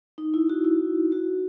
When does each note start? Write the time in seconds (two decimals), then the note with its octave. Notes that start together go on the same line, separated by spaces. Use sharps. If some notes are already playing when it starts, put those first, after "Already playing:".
0.18 D#4
0.34 E4
0.49 F#4
0.64 E4
1.12 F#4